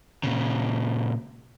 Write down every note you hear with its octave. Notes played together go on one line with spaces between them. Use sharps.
A#2 C#3